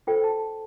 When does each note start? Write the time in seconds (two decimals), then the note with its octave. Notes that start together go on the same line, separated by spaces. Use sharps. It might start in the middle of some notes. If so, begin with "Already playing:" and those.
0.07 F4 A4 C5 G5
0.24 A5